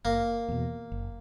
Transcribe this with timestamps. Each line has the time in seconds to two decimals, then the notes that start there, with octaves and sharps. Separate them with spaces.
0.05 F#1 A#3
0.48 E2 B2
0.92 F#1